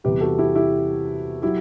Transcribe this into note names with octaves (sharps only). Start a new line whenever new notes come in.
E2 C3 G3 G4 B4
F#4 A4
E4 G4
E4 G4
F#3 E4 G4